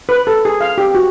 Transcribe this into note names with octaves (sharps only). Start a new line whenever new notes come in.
B4
A4
G#4
F5
G4
F#4